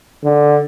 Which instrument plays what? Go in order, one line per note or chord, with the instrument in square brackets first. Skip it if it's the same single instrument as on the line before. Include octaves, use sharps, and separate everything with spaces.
[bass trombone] D3